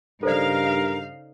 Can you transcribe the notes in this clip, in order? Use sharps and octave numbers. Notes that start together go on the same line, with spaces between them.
G2 C#3 D#4 A4 A#4 C5 D5 F5